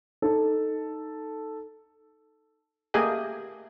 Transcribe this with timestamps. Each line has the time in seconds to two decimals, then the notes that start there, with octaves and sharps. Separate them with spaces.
0.22 D#4 A4
2.94 A3 A#3 G4 G#4 D#5 G#5